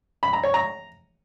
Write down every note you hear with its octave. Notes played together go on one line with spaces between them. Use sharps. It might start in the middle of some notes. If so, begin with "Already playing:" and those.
B5
A#5
C#5
A#5